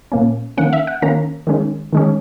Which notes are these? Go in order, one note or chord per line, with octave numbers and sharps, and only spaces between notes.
A#2 A#3 C#4
D#3 A#3 C#4 F#5
E5
F#5
D#3 A#3 C#4 A#5
D#3 G#3 C#4
D#3 G#3 C#4